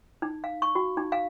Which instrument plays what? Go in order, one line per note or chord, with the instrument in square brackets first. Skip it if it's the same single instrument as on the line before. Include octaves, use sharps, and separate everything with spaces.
[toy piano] D#4
F5
C#6
F#4
D#4
F5